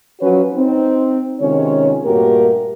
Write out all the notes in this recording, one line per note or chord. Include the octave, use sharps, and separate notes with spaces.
F3 F#3 C#4 F#4 B4 C#5
C4 D#4
C3 D#3 G#3 C#4 F4 C#5
G2 A#2 A3 F#4 G4 A#4